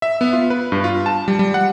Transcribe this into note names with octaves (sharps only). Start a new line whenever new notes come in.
E5
B3
F4
B4
G2
F4
A5
G3
G3
F#5